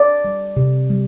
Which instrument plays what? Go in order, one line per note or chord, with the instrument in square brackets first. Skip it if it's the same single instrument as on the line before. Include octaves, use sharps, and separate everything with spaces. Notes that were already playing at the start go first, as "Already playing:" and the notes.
Already playing: [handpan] D5
G3
C3
G3